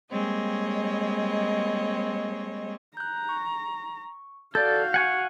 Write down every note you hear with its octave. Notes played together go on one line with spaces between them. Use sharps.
G3 G#3 A#3 C4 C#5 D#5
A#5 F#6 G6
C#6
F#4 A4 D5 F5 G6
F#5 G#5 C#6